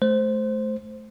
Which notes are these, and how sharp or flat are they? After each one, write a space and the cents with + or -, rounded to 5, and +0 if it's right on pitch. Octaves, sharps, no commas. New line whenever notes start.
A3 -25 C5 +0